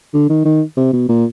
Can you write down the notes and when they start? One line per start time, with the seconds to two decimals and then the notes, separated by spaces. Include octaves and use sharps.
0.14 D3
0.29 D#3
0.45 D#3
0.77 C3
0.93 B2
1.09 A#2